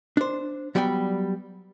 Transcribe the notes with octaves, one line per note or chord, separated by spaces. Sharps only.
D4 C5
F#3 G3 B3 D5 G5